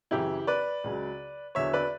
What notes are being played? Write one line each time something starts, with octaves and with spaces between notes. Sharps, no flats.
F#2 C#3 E3 E4 G4
B4 D5
C#2 C#3 F#3
E2 D3 F#3 C#5 E5
B4 D5